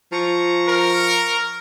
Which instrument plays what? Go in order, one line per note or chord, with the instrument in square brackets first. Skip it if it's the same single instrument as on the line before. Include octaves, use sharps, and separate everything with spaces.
[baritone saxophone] F3 [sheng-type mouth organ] A#5 C#6
[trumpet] A#4